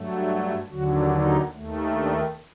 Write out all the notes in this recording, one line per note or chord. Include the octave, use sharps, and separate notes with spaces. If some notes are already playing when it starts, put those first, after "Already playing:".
Already playing: G2 F#3 A3
D#2 D3 F#3 F#4
D#4
D#2 D#3 A3
D4